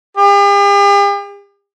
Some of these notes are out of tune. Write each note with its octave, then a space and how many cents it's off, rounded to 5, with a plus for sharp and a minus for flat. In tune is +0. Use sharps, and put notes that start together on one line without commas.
G4 +45